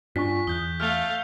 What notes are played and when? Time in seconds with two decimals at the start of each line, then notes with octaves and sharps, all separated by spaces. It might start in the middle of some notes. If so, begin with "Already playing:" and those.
0.16 G2 D4 F4 G#5 C#6 B6
0.47 E2 D#6 F#6 G6 G7
0.80 A3 F5 F6 F#6 F7